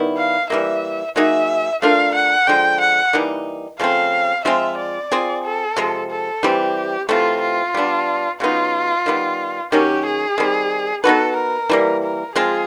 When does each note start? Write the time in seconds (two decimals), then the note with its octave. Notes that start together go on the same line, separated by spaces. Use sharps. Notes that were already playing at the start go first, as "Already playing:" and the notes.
Already playing: D#3 G3 B3 E4
0.17 F5
0.50 E3 G3 A#3 E5
1.16 F#3 A#3 D#4 G#4 E5
1.82 A3 D4 F4 A#4 F5
2.15 F#5
2.47 D3 F3 G#3 G5
2.81 F#5
3.13 E3 G3 A#3 D#4
3.79 C#3 F3 A3 C4 F5
4.45 F3 G#3 C4 F4 E5
4.78 D5
5.12 C4 F4 G#4
5.44 A4
5.76 C3 F3 G#3
6.11 A4
6.43 E3 G3 C4 G4
7.09 C3 E3 A3 C4 F4
7.42 F4
7.74 G3 B3 D4
8.40 C#3 F#3 B3 D#4 F4
9.06 D#3 G3 B3
9.72 D#3 F#3 A#3 C#4 G4
10.06 G#4
10.38 D#3 G3 C4
11.04 B3 D#4 F#4 A4 B4
11.37 A#4
11.70 E3 G3 A#3
12.03 A#4
12.36 F3 G#3 C4 F4 G#4